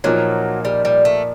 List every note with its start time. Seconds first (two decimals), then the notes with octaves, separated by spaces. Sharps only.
0.04 A#2 F3 F#3 A#3 D#4
0.65 G3
0.85 G3
1.05 A3